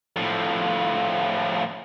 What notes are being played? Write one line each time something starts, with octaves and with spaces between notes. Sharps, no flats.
A2 F3